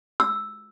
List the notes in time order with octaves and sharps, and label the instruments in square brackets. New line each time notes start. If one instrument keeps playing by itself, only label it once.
[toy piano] E6